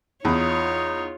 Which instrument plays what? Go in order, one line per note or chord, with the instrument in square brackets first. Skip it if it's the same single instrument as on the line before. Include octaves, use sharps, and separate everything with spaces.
[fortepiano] E2 [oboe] D#4 [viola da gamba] F4 C#5